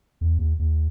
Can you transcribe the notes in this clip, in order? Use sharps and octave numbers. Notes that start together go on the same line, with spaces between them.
E2
D#2
D#2